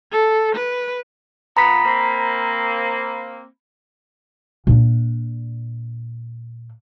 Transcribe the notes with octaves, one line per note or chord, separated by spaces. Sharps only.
A4
B4
A#2 B3 A#5 B5 B6
A#3 C4
A#2 D4